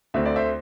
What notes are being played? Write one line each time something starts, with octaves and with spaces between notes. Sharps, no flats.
D2 D3 A3 C4 E5
D5
C5 E5